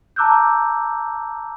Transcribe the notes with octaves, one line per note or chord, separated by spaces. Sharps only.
A5 A#5 D6 E6 F#6 G6